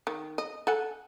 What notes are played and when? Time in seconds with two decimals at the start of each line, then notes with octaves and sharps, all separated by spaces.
0.07 D#3
0.38 D#5
0.67 A4 F#5 G#5